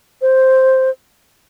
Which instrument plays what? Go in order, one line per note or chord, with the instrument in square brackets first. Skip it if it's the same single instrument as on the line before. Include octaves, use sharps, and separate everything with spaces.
[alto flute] C5